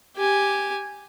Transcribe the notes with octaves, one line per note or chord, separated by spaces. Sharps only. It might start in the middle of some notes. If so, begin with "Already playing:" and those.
G4 G#5